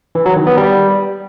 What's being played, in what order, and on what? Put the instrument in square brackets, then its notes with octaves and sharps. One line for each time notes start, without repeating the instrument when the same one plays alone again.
[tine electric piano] E3
F#3
D#3
B3
G3